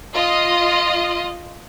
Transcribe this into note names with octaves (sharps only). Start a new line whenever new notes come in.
F4 D#5 D#6